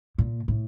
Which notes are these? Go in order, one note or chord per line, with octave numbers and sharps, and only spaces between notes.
A#2
A2